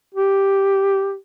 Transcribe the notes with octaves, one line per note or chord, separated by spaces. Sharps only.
G4